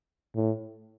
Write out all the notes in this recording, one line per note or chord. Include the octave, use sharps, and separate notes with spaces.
A2